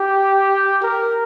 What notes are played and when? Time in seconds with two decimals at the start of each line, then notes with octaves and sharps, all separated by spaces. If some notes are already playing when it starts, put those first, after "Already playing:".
Already playing: G4
0.83 A#4